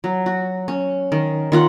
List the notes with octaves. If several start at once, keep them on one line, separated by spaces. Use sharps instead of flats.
F#3
F#4
C#4
D#3
D#3 F4 F#5